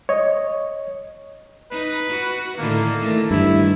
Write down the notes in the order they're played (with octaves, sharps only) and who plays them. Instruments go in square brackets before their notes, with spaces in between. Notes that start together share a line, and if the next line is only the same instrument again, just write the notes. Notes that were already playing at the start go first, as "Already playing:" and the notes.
[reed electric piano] C#5 D#5
[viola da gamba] D#4 [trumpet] B4
[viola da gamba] F#4
[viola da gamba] A2 D3 D#3 [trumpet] A#3
[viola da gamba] D#3 E3 A3
[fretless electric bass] G2 [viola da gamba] D#3 [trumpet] E4